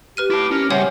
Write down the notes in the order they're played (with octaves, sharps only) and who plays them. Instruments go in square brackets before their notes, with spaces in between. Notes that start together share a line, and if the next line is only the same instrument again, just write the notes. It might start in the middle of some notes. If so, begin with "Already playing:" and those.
[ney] G4 [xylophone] B4 F6 D#7
[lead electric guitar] E4 A5 [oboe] D6
[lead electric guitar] C#4 [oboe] A#4
[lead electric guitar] C#3 G3 [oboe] C5 [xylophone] C#5 F#5 G#5 [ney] E5